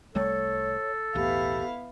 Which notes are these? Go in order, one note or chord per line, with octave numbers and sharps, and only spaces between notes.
C2 G3 A3 A4 C#5
B1 E2 A2 B3 E4 G4 F5